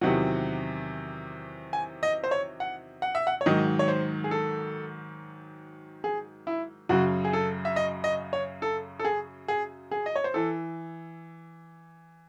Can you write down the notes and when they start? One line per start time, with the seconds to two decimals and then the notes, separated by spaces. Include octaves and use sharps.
0.01 E2 C3 D#3 F#3 F#5
1.73 G#5
2.03 D#5
2.24 C5
2.31 C#5
2.60 F#5
3.02 F#5
3.15 E5
3.27 F#5
3.41 C#5
3.46 G#2 D#3 F#3 D#5
3.79 C#5
3.88 C5
4.24 G#4
4.31 A4
6.04 G#4
6.47 E4
6.89 F#2 C#3 F#3 F#4
7.25 G#4
7.33 A4
7.65 E5
7.76 D#5
8.04 D#5
8.33 C#5
8.62 A4
8.99 A4
9.05 G#4
9.48 G#4
9.91 G#4
10.06 D#5
10.16 C#5
10.24 C5
10.34 E3 A4